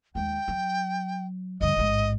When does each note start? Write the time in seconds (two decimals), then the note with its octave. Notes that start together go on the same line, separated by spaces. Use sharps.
0.15 D#2 G#3 G5
0.48 F#3
1.61 D2 G2 D#5
1.76 A1 G#2